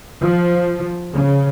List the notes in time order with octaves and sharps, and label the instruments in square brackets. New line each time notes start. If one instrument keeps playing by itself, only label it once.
[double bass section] F3
C#3